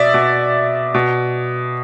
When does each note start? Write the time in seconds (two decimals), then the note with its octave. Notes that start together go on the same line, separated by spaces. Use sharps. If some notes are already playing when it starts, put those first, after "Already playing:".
Already playing: B2 D5 E5
0.14 B2
0.94 B2